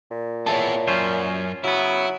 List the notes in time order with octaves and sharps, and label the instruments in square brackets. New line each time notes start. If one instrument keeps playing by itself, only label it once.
[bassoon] A#2
[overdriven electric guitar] B3 G#4 [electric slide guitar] C#5 E5 A5
[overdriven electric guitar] F#2 [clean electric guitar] C#4 F4 C5
[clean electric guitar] C#3 B3 [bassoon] F#3 [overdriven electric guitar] E4